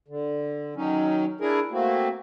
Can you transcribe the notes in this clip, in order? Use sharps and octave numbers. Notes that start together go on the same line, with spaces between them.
D3
D#3 F#3 C#4 D#4
D4 E4 G#4 A#4
A3 A#3 C4 F#4